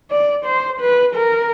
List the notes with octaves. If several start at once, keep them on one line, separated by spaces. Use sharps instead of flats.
D5
C5
B4
A#4